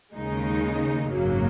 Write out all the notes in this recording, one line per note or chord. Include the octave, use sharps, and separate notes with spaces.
D#2 C#3 G#3 D#4
G#1 F#2 C#3 F#3 A#3